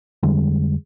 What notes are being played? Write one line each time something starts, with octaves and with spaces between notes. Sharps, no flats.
F2 D3 G3 G#3